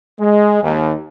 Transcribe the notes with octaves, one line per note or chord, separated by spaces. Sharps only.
G#3
D#2